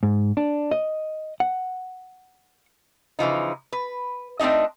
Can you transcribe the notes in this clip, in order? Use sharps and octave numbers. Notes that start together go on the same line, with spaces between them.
G#2
D4
D#5
F#5
C#3 E3 F3 D#4
B4
A3 C4 D4 D#4 D#5